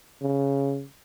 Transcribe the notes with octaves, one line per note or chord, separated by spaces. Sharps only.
C#3